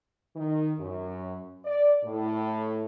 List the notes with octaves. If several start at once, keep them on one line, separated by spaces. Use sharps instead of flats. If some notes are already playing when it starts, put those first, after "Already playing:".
D#3
F#2
D5
A2